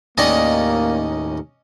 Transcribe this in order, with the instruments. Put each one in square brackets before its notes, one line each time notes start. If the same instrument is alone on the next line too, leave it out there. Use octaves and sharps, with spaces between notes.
[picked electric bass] D#2 A2 D#3 [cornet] A#3 [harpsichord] C#4 D5 D#5